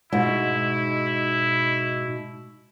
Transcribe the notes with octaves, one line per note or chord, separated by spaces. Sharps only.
G#2 B2 E4